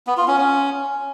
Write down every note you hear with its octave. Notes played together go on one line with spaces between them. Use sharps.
B3
F4
C#4
C#4